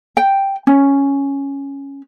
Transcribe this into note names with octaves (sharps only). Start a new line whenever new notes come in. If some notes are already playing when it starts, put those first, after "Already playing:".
G5
C#4